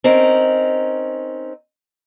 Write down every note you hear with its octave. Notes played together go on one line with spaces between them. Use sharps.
C4 C#4 D#4 A#4